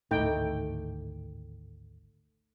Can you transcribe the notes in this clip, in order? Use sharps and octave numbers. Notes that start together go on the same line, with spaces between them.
G#1 D2 A2 A3 D#4 G5